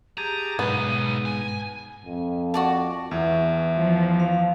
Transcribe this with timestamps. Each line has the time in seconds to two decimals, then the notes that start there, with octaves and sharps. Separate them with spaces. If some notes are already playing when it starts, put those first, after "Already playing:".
0.18 G4 G#4 A5 A#5 D#7
0.59 B1 G#2 B3
1.25 G#5
2.05 F2
2.54 F#4 D5 A5
3.11 E2 E5
3.75 F3
4.20 F5